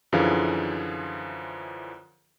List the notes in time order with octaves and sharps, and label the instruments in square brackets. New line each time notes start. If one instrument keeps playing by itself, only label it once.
[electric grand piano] F#2 D3 E3 F3 G#4 F5